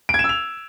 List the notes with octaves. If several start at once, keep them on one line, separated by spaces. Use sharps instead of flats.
D7
G#6
E7
E6
F7